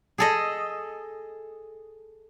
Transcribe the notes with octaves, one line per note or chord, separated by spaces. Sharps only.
G#4 A4 D#5